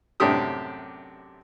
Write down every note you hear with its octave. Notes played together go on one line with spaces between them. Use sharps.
F#2 A2 C3 D4 G4 D#6